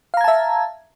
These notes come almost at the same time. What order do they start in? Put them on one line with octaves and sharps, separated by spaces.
F5 A#5 G#6 A5 E5